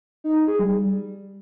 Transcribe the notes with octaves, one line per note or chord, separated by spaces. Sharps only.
D#4
D#4
G#4
G3